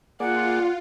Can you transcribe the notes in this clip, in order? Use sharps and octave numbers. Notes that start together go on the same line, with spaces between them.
A#3 F4 G#4 D5 F#5